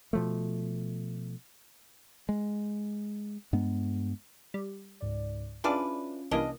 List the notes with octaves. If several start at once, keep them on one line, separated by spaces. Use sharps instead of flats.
B2 F3 A3
G#3
G2 G#3 B3
G3
C#2 G#2 D5
C#4 D4 E4 F4 G#4 B4 D5 F5
C2 E3 A#3 C#4 D4 D#5